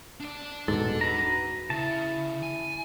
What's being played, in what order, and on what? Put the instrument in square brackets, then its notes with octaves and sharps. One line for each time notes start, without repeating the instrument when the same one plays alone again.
[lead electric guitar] D4 D5
[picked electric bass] D#1 G#2 [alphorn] B2 [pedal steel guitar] A4
[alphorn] F#4 [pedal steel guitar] B4 A#5
[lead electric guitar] C#3 [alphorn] E4 [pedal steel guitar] A5
[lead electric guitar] G#5